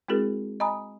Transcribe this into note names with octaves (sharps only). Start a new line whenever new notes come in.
G#3 C4 E4 F#4 G#4 A#4
D#5 G#5 A#5 B5 D#6